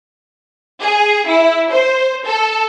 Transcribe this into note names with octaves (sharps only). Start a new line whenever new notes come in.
G#4
E4
C5
A4